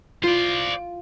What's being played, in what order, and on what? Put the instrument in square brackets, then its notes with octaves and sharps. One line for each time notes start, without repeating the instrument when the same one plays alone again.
[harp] F4 [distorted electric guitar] C5 D5